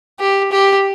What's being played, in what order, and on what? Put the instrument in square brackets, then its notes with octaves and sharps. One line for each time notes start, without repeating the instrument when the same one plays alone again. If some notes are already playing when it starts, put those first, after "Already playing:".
[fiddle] G4
G4